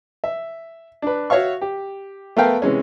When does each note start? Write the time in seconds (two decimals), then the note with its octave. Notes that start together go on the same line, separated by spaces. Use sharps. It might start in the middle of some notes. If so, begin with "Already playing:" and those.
0.24 E5
1.02 D4 B4
1.30 F#4 C#5 E5 F5 C#6
1.61 G4
2.37 A3 B3 A#4 F5 G5
2.62 C3 E3 G#3 C#4